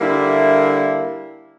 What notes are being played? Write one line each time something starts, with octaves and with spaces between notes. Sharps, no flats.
D3 G3 A#3 E4